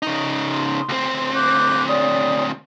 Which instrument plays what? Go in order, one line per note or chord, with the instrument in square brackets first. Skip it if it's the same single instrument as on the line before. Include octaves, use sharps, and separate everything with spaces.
[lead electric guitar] C#3 D#4
[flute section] C6
[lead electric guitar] D2 C4
[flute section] D6 F#6 G6
C#5 D5 D#6